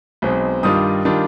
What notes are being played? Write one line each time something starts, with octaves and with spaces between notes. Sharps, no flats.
B1 B2 G#3 C4
G2 D#3 G3 D4 F4 D#6
D#3 G3 D4 F4